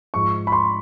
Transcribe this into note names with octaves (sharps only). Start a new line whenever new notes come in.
G#2 F3 C#6
B5
C6